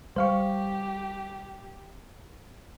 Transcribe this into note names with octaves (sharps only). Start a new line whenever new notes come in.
G3 G4 C5 F5 C#6